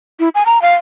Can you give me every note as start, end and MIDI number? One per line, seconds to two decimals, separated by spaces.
0.20 0.29 64
0.35 0.43 80
0.46 0.61 82
0.62 0.73 77